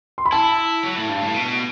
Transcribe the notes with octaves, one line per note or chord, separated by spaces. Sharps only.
C6
B5
E4 A5
F#3
A2
G2
A2
B2